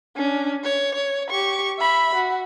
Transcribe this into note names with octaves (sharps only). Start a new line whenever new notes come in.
C#4 D4
C#5
C#5
G4 C#6
E5 B5
F#4